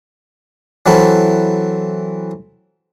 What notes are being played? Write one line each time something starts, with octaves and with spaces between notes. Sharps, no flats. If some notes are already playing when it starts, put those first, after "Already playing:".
E3 F#3 C4 E4 A4